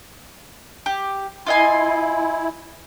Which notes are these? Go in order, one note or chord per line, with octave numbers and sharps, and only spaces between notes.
G4
E4 F4 D#5 G#5